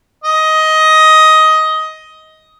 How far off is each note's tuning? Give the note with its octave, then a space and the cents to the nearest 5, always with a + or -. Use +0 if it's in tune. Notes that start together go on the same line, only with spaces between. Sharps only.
D#5 +15